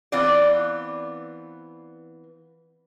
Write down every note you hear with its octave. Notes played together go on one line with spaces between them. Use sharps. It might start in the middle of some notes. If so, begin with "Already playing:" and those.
E3 B3 C4 F4 D5